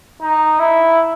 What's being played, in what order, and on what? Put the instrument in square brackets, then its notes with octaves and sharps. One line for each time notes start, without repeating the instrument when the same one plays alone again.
[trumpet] D#4
E4